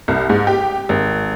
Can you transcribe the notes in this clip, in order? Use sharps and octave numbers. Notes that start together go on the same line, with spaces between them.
C2
G#2
G4
G#1